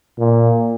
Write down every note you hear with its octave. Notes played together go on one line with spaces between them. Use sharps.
A#2